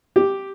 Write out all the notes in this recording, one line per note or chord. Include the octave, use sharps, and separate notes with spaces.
G4